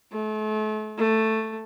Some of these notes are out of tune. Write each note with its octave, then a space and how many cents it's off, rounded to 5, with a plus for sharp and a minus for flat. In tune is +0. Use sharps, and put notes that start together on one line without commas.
A3 -40
A3 +5